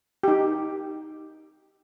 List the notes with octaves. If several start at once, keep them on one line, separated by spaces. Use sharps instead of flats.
D#4 G4